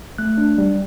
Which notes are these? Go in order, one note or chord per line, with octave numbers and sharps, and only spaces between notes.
A3 F#6
D4
G3